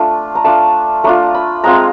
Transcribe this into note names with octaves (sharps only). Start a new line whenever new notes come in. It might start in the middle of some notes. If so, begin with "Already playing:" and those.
Already playing: A3 D4 F4
A#5
A3 D4 F4 A5
A3 D4 F4 A#5
B5
G#3 C4 F4 A#5